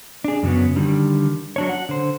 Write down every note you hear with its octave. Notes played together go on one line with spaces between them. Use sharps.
D4 G#4
F#2 C#3 F#3 B3
D3 D#3 G3
F#3 D4 C#5
F#5
D3 C5